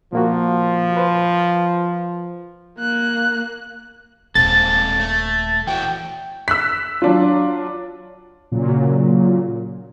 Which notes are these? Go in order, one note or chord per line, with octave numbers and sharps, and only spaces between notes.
A#2 F3 A#3 F#4
B4 C5
A#3 F#6
D#1 G#3 C4 A4 A6
A3
E3 F#4 G5
E6 F#6 B6
F#3 D4 F4
A#2 C#3 F#3